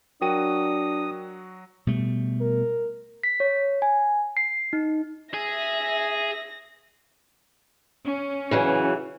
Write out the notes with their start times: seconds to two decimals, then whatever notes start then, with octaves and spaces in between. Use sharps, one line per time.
0.21 F#3 D4 F#4 A#4 G5 D#6 D#7
1.87 B2 G3 A3
2.41 A#4
3.23 B6
3.40 C#5
3.82 G#5
4.37 C7
4.73 D#4
5.34 G#4 E5 A#6
8.04 C#4
8.51 C#3 E3 F#3